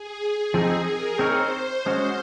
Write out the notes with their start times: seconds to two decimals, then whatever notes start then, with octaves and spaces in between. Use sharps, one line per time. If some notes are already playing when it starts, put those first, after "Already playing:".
Already playing: G#4
0.20 G#4
0.54 F3 C4 D#4
0.87 A#4
1.19 C4 D#4 A#4 C5 C#5
1.85 G#3 C#4 F#4 C5